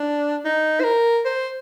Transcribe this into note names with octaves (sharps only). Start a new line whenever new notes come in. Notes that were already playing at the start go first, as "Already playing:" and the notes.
Already playing: D4
D#4
C5
A#4
C5